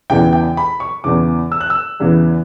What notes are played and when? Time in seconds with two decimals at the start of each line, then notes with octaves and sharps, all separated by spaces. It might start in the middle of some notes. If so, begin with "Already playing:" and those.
0.10 E2 C#3 E3 G5
0.33 G5
0.57 B5
0.80 C#6
1.04 E2 C#3 E3 D6
1.52 E6
1.61 F#6
1.70 E6
2.00 E2 C#3 E3